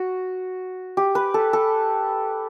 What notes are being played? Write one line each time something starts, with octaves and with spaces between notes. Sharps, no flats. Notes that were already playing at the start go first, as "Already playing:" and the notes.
Already playing: F#4
G4
B4
A4
A4